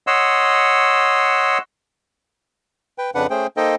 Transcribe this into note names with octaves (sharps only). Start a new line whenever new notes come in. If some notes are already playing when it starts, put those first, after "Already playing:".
C#5 D#5 F#5 C6 E6
B4 G5
F2 C#3 D4 B4 F#5
A3 C#4 G#4 C5 G5
A#3 D#4 A4 C5 D#5 G5